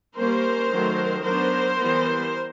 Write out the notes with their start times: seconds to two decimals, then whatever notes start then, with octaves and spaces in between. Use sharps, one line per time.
0.15 G3 A#3 C#4 A#4 C5
0.69 D#3 F#3 A3
1.23 F#3 B3 D4 A#4 C5
1.78 E3 G3 B3